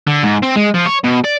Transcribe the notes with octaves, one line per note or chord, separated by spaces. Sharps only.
D3
G#2
C4
G#3
F3
C#5
B2
D5